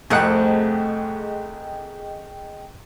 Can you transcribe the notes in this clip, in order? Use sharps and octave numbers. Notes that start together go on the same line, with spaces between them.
C2 F2 A3 C4 G#4 D#5 F#5 G5